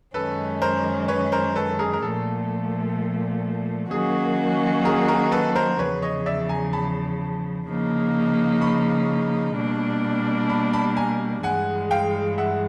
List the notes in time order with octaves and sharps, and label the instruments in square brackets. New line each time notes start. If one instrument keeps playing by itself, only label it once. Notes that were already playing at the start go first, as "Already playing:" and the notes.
[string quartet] F#2 D#3 G#3 C#4 [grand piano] A4 B4
[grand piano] A#4 C5
B4 C#5
A#4 C5
A4 B4
G#4 A#4
A#4
[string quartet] A#2 F3 A3 [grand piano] A4
[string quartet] D#3 F#3 A#3 C#4 F#4 [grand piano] G#4
[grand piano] G#4 A#4
G#4 A#4
A4 B4
A#4 C5
[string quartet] E2 C#3 F3 [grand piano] B4 C#5
[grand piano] C#5 D#5
D5 E5
G#5 A#5
A5 B5
[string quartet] C#3 F3 A#3 D#4
[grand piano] B5 C#6
[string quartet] B2 G3 A#3 D4
[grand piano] A5 B5
A5 B5
G#5 A#5
[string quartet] G2 E3 G#3 [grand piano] F#5 G#5
[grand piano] F5 G5
E5 F#5